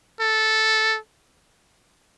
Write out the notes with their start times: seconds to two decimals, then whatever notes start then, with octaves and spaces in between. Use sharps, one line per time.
0.20 A4